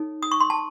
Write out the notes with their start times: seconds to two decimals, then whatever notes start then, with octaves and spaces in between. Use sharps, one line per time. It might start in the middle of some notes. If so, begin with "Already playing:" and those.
Already playing: D#4 A4 C#5
0.23 D#6
0.31 C#6
0.40 C6
0.50 A5